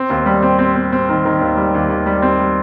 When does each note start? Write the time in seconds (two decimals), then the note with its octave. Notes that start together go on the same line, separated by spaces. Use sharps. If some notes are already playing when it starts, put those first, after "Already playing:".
Already playing: C4
0.10 D#2
0.26 G3
0.42 C4
0.59 C4
0.75 C4
0.92 C4
1.09 D#3
1.25 D#3
1.41 D#2
1.57 G3
1.74 D#2
1.90 D#2
2.06 G3
2.22 C4
2.39 G3